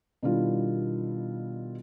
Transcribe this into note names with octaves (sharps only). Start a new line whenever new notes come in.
B2 D#3 G3 D4 E4 F4